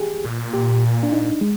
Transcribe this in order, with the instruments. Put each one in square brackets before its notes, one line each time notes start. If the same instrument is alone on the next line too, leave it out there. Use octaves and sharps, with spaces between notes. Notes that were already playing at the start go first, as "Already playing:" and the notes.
Already playing: [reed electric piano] G4 G#4
[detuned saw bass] A#2
[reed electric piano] G4
D4
D#4
G#3